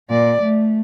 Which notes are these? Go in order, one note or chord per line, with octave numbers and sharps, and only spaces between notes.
A#2 D5
A3